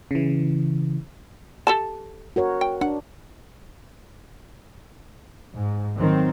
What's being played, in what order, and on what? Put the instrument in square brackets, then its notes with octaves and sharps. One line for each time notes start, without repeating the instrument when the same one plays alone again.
[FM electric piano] C#3 E3
[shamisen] G4 A4 A5
[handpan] F#4 A#4 C#5
[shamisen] G5
[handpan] D4 [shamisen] F#5
[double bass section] G#2
D#3 F#3 C4